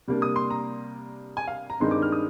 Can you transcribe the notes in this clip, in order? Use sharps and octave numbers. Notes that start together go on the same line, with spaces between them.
C3 G3 A#3 D4
D#6
C6
A#5
G#5
F5
A#5
G2 D#3 G#3 C4 D#4 C6
D6
F6
D#6